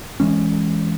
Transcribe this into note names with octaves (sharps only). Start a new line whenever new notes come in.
E3 G#3 C#4